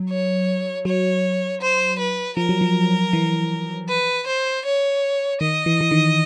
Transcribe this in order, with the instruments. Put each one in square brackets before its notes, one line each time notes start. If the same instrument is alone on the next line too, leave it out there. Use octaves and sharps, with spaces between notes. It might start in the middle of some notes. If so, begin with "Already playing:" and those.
Already playing: [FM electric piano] F#3
[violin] C#5
[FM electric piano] F#3 [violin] C#5
[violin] C5
B4
[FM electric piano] F3 [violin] A#4
[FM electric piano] F#3
F3
E3
[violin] B4
C5
C#5
[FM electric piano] D#3 [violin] D#5
[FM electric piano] E3
E3
D#3